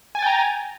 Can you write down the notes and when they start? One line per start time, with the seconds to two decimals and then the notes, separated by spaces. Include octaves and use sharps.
0.15 G#5
0.19 A6
0.22 G5
0.26 A#5